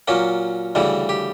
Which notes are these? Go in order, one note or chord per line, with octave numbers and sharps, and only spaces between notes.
A#2 F#3 A#3 C#4
D2 C#3 E3 G3
G4